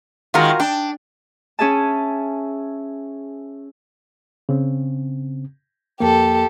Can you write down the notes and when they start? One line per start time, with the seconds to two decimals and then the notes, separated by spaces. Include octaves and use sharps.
0.34 D#3 G#3 F4 F#4 A#4
0.60 D4 G5
1.59 C#4 G#4 E5 A5
4.49 C#3 C4
6.00 F2 A#3 G4 A4